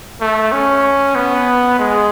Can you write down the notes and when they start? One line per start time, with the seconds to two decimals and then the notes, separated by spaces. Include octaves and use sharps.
0.21 A3
0.52 C#4
1.15 B3
1.79 G#3